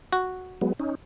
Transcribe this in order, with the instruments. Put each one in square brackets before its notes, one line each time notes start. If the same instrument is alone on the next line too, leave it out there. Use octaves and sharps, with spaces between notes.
[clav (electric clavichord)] F#4
[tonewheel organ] F#3 G#3 B3
C#4 D#4